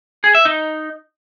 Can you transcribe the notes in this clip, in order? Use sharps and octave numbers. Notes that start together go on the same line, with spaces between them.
G#4
E5
D#4